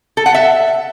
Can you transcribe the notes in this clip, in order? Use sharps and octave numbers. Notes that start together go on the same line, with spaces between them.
A4
F#5
E5